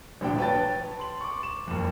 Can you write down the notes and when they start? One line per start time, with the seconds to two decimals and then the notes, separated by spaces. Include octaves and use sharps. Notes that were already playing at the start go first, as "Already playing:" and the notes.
0.21 D1 A#1 D4 G5
0.38 B4 C#5 G5 A5 A6
1.00 C6 F#7
1.21 C#6 D6
1.43 E7
1.67 F#1 F2